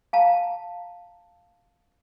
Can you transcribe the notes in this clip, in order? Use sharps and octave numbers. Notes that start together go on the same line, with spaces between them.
F5 A5 A#5